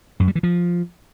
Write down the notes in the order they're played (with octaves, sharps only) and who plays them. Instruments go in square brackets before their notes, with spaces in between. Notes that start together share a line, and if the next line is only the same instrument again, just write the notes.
[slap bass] F#2
G3
E3
F3